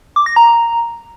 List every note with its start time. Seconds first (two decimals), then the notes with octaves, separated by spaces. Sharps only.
0.16 D6
0.26 A#6
0.36 A#5